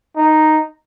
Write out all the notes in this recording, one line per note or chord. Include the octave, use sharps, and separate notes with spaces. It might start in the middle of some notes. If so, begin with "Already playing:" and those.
D#4